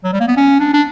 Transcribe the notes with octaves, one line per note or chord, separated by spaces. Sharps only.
F#3
G3
A#3
B3
C#4
D4
D4